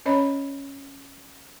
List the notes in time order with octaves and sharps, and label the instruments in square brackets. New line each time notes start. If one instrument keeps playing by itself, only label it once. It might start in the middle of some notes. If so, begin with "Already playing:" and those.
[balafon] C#4 B4 C#5 D#5 B5